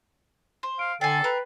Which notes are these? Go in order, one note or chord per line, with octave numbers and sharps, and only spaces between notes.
C5
F5 D7
D3 A4 D5 G5 G#5 A6 C7
A#4 B4